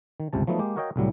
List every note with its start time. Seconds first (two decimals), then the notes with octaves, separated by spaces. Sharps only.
0.20 D#3
0.33 G1 C#2 C3 A5
0.47 F3 F#3 A3 B3 D#4
0.59 G#3 A#3 G4
0.76 F#4 A#4 C#5 D#5 F5 G5
0.96 C2 A2 F#3 G3